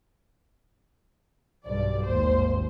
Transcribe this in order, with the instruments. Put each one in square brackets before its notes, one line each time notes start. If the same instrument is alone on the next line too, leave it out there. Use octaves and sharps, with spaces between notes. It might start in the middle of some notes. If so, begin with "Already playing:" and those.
[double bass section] B1 G2 [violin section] D5
[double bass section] G#1 D#2 [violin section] C5